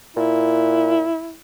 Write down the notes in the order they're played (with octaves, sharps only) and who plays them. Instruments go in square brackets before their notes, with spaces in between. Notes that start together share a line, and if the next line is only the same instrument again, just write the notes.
[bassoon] A#2 [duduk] E4